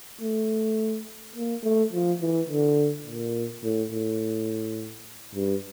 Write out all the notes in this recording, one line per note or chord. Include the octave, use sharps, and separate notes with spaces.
A3
A#3
A3
F3
E3
D3
A#2
A2
A2
G2